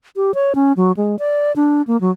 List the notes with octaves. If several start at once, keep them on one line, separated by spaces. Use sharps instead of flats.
G4
C#5
C#4
F#3
G#3
D5
D4
A#3
F#3